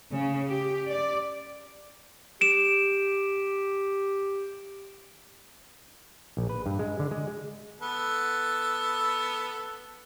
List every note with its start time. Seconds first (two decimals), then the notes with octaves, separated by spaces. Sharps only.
0.12 C#3
0.48 G4
0.88 D5
2.41 G4 D7 E7
6.37 A#1
6.49 B4
6.66 G2
6.79 G#3
6.99 D3
7.11 G#3
7.81 B3 A4